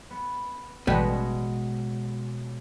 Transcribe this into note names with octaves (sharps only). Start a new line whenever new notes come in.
B3
A1 B2 G3 G#3 B4 C#5